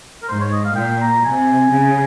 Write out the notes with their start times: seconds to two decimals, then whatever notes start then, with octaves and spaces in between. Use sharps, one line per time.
0.23 A#4
0.29 G#2 C5
0.41 C#5
0.52 D#5
0.65 F5
0.76 A#2 G5
1.00 A#5
1.24 C3 G#5
1.71 C#3